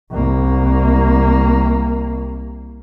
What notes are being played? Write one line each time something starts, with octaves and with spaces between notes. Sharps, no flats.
C2 A#3